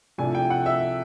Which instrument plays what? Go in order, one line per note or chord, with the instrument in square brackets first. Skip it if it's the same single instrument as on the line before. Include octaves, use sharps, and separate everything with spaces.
[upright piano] C2 C3 F3 A3 D4 G#5
G5
F#5
E5